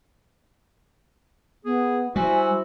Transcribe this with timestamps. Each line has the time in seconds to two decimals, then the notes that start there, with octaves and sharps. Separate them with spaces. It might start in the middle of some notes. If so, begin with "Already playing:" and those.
1.65 B3 G#4
2.16 G3 E4 F#4 C5 E5 G#5